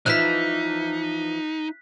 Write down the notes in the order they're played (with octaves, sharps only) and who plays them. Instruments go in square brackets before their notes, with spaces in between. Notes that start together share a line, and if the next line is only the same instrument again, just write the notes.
[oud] E3 F3 E4 [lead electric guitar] D#4 [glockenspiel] F#6 B6